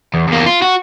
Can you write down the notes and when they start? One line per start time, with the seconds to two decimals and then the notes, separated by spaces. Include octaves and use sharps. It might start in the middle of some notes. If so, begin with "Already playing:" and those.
0.14 E2
0.28 E2 A#3
0.47 F4
0.62 F#4